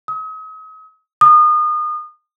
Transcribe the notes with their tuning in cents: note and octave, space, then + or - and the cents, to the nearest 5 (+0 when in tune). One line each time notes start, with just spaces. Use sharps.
D#6 +40
D#6 -30